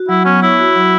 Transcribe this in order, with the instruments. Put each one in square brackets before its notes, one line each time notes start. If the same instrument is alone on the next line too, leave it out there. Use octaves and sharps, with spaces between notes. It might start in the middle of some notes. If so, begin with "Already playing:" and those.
Already playing: [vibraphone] F#4
[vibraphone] F#3 [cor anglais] E4
[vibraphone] B3 [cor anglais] C#4
[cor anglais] E4 [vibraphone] C#5
[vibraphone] F#4
F#3